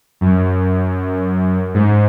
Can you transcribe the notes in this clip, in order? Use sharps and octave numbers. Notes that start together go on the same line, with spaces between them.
F#2
G#2